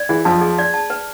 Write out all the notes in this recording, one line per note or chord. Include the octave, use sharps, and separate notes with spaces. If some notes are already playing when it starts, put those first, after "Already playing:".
Already playing: D5
E3 G#4
F2 F3 A5
G#4
D5
A5
B4